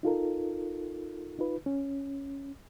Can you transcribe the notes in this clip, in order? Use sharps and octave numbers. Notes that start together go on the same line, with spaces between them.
D#4 F4 A4 A#4
D#4 F4 B4
C#4